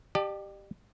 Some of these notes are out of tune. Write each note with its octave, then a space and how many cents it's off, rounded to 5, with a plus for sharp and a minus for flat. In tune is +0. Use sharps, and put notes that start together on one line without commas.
G4 +0 D5 +45 A5 +0